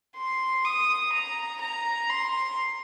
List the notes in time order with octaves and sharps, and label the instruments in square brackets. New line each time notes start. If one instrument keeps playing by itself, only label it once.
[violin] C6
D#6
A#5
A#5
C6